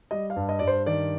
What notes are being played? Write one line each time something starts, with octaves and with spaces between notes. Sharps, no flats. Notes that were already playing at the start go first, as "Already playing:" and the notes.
G3 D#5
F5
G2
D#5
G2 D5
C5
D#3 D5